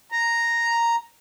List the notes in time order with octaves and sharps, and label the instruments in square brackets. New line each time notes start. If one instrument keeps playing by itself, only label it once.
[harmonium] A#5